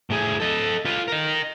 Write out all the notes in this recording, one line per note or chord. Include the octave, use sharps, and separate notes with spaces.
A2 G#4
A4 D#5
F4 B4
A#4 D#5